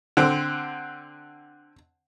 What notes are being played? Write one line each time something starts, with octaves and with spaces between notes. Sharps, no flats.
D3 C4